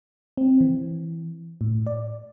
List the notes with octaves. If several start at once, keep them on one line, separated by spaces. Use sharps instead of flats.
C4
E3
A2
D5